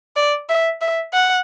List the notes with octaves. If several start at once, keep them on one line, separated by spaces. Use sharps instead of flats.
D5
E5
E5
F#5